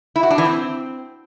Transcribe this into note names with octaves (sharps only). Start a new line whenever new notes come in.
E4
F#4
D4
E3
C4